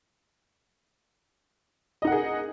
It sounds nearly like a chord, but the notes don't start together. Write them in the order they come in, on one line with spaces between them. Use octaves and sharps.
D#5 D#4 F#5 A#4 G#4